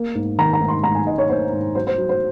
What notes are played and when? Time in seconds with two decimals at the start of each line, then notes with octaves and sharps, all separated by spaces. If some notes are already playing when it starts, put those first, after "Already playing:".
Already playing: A#3
0.15 G#2
0.38 D#3 A#5
0.53 A#5
0.61 G#2
0.68 C6
0.84 G#2 A#5
0.95 G#5
1.07 G#2 D#5
1.18 C#5
1.29 A#3 C5
1.52 G#2
1.75 F#3 C5
1.87 C5
1.98 F#3
2.09 C5